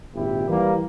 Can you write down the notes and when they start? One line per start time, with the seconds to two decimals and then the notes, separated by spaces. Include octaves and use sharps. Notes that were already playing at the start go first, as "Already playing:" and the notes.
0.14 G#1 A#2 E4 G4
0.49 E3 G3 A#3